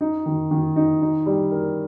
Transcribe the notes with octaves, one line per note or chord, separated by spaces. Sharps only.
D#4
D#3
D#3
D#4
D#4
G3
A#4